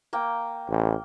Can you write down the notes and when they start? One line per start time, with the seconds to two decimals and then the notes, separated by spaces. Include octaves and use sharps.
0.13 A#3 G5
0.69 A1